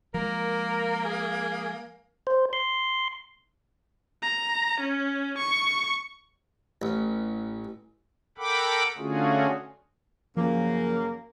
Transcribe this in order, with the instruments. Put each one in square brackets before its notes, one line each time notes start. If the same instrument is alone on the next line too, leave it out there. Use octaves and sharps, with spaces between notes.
[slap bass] F3 G#3 [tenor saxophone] A#3 [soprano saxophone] A#4
[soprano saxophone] G#4
[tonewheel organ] C5
C6
[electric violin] A#5
C#4
C#6
[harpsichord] A1
[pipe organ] A4 A#4 F#5 G5 B5 D6
D3 A3 C#4 F4 F#4 G#4
[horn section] F#2 C#3 A#3 [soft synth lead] F3